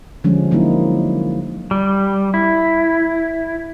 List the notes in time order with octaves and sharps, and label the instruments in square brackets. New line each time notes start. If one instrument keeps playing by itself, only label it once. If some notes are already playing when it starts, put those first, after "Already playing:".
[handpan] D3 F3 G3 G#3 C#4
F#3 A#3 D#4 E4
[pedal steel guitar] G3
E4